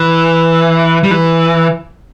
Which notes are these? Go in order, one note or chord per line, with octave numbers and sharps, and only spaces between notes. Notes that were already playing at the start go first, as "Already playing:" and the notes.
Already playing: E3
G3
E3